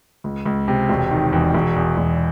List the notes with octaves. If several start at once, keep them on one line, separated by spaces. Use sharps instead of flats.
C#2
C#2
C3
E1
D#3
E2
E1
E2
E1